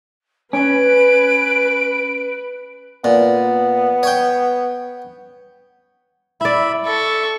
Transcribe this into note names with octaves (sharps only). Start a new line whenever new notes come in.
C#4 B4 D7
A#2 B3
C#5 G5
E4 D5 E5 B5
A4 E5 C#6